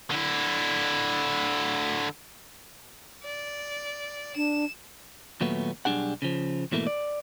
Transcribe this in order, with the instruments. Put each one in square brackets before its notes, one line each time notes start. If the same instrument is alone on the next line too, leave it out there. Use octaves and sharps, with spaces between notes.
[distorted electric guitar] D3 E4
[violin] D5
[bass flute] D4 [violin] E7
[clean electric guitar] D#2 A#2 F#3 A3 B3
B1 C3 G3 D4 G#4 F#5
C#3 F3
G#2 B2 E3 A3 A#3
D5